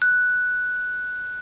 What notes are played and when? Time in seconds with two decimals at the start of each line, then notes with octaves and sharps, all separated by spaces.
0.02 F#6